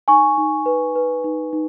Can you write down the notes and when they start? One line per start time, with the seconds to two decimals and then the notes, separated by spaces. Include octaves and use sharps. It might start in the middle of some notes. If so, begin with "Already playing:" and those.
0.08 D#4 G#5 C#6
0.38 D#4
0.66 B4
0.96 B4
1.24 D#4
1.53 D#4